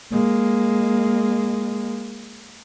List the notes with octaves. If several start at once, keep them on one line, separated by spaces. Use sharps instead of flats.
G#3 A#3